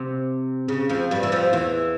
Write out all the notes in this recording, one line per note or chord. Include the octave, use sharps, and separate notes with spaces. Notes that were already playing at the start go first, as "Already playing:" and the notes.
Already playing: C3
C#3
F2 F3
G2 G3
E3
F2 F3
E2 E3